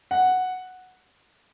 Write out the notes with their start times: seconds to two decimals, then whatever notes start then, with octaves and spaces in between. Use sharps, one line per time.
0.11 F#5